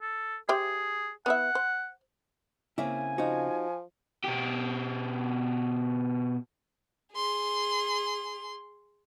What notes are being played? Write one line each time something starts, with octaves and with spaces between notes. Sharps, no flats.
A4
G4 G#4 C5 E5
B3 E4 E5 F#5
C5
C#3 A#3 C4 E4 E5 G#5
F3 D#4 F#4
B2 G4
G#4 C6